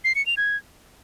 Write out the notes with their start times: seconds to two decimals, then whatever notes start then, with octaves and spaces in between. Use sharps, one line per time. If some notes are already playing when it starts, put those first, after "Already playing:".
0.04 C7
0.15 C#7
0.26 F7
0.37 G#6